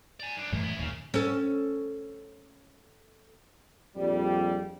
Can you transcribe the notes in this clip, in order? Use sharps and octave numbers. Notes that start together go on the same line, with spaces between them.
D5 G#5
F#2 D4
C#2 F#2 A2 E3
B3 E4
D#2 A#2 C#3
C#4 A4
A#1 F2 G3